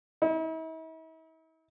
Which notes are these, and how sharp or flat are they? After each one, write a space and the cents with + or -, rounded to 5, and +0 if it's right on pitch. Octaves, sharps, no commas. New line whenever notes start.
E4 -45